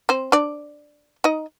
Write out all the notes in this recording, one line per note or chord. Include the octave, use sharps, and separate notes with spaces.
C4 C5
D4 D5
D#4 D#5